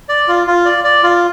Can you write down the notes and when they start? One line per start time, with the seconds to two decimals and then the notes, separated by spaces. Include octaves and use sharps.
0.09 D5
0.28 F4
0.47 F4
0.65 D5
0.84 D5
1.03 F4